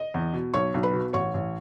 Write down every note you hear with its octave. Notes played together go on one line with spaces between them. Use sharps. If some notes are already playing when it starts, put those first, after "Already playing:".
Already playing: D#5
E2
B2
B1 C#5 C#6
B1
B4 B5
B2
A1 C#5 C#6
A1